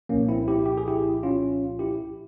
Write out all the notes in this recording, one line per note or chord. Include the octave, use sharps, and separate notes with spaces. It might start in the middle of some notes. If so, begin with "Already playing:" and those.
C2 A#2 F3 A#3 C#4
C4 E4
E4 G4
G4
G#4
E4 G4
C#4 F4
E4 G4